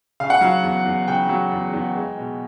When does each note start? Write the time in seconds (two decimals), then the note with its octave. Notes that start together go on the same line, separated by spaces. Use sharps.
0.20 C#3 F5
0.30 F#5
0.41 F#3 F5
0.63 E2
0.86 E2
1.08 C#3 G5
1.29 F#3
1.52 E2
1.73 E2
1.96 G#3
2.17 B2